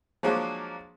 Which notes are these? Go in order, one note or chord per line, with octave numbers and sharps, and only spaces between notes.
F3 F#3 G#3 A#3 D4 F4